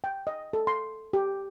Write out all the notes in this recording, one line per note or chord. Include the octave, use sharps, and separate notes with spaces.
G5
D#5
A4
C6
G4